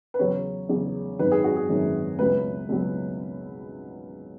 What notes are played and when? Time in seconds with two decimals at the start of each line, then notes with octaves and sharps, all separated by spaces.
0.14 B4
0.19 E2 C#3 F#3 C#5
0.69 E2 C#3 F#3
1.19 G#1 F#2 D#3 F#3 B4
1.32 G#4
1.44 F#4
1.57 G#4
1.69 G#1 F#2 D#3 F#3
2.19 C#2 B2 F#3 B4
2.69 C#2 B2 F#3